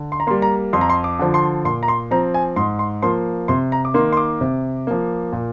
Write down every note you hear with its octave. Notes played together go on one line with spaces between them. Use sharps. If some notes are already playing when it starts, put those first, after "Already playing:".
Already playing: D3
C6
A#5
G3 A#3 C6
A#5
F2 C6
A#5
C6
D6
D3 F3
C6
A#2 C6
A#5
C6
F3 C4 A#5
G#5
G#2 C6
C6
F3 A#3 C6
C3 C6
A#5
D6
D#3 A#3 C6
C6
D6
C3
F3 A#3
A#2